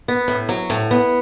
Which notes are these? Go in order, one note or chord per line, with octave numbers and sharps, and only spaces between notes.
B3
A2
F#3
A2
B3